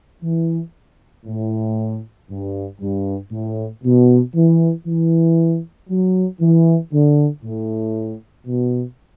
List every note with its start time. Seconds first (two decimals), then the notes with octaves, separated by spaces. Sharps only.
0.23 E3
1.26 A2
2.29 G2
2.80 G2
3.31 A2
3.83 B2
4.34 E3
4.86 E3
5.89 F#3
6.40 E3
6.91 D3
7.43 A2
8.46 B2